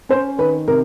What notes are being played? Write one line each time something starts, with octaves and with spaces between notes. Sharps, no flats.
C#4 C5
D#3 B4
C3 A#4